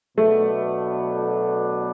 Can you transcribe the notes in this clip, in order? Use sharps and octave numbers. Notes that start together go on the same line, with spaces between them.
B2 F#3 A3 B3 D4